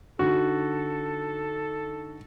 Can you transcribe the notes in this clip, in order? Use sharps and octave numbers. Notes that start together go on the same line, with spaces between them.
D3 D#4 F#4 A4